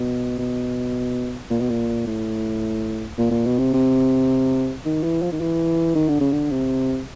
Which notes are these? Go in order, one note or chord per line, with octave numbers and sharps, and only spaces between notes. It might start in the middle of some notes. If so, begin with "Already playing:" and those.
Already playing: B2
B2
A#2
B2
A#2
A2
A#2
A#2
B2
C3
C3
D#3
E3
F3
D#3
E3
D#3
D3
C#3
D3
C3